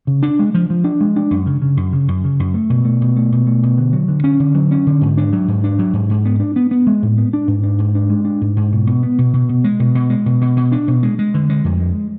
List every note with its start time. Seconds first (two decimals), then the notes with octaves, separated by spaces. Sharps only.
0.07 C#3
0.23 D4
0.39 G#3
0.54 F3
0.70 F3
0.84 D4
1.01 G#3
1.16 D4
1.31 F#2
1.46 C#3
1.62 C#3
1.77 F#2
1.93 C#3
2.08 F#2
2.24 C#3
2.40 F#2
2.54 A3
2.70 B2
2.85 A3
3.02 B2
3.16 A3
3.32 B2
3.47 A3
3.63 B2
3.78 D3
3.93 F#3
4.08 D3
4.24 C#4
4.40 D3
4.55 F#3
4.71 C#4
4.87 D3
5.01 G#2
5.17 D4
5.33 F#3
5.48 G#2
5.64 D4
5.79 F#3
5.93 G#2
6.10 G#2
6.25 B3
6.40 D4
6.56 B3
6.71 B3
6.87 G#3
7.03 A2
7.18 B3
7.33 D4
7.48 G#2
7.63 D4
7.78 G#2
7.95 D4
8.10 G#3
8.25 D4
8.41 G#2
8.57 G#2
8.72 B2
8.87 B2
9.03 B3
9.18 B2
9.33 B2
9.49 B2
9.64 G#3
9.80 B2
9.95 B2
10.10 G#3
10.26 B2
10.41 B2
10.57 B2
10.72 D4
10.88 B2
11.03 G#3
11.19 G#3
11.34 D3
11.50 G#3
11.64 F2
11.80 G#3